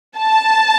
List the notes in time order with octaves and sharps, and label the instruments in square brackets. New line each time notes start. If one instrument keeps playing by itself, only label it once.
[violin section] A5